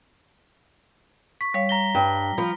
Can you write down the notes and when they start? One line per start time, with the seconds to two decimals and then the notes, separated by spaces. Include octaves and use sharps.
1.41 C#6 B6
1.54 G3 C#5 F5 B6
1.69 A#5 A#6 G7
1.95 G2
2.38 F3 F4 B5